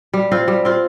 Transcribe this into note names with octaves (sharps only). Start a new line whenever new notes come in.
G3
C4 F4
G3
C4 F4